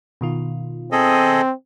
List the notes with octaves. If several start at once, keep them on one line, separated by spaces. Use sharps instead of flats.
B2 D#3 F4
C4 G#4 A4 D#5